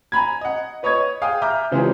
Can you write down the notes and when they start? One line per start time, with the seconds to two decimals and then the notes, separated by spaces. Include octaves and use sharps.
0.12 G#5 A#5 B5 G#6
0.41 D#5 F#5
0.83 B4 C#5 D#5 C#6 G#6
1.22 G#4 F5 G5 D#6
1.42 E5 A#5 D6 F6 G6
1.71 C#3 E3 F3 G#3 G4 G#4